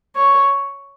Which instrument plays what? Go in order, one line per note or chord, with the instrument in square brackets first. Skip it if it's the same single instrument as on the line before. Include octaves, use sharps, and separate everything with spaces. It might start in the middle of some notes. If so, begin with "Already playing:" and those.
[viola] C#5